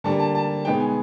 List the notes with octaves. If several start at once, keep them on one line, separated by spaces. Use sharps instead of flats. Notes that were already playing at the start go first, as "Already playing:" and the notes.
D3 G3 A#3 A5
A5
A5
B2 G#3 B3 D#4 G5
G#5